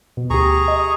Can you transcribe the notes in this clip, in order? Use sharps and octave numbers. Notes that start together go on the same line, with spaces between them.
B2
D2 G4 G#4 A#5 C#6
D#5
D#6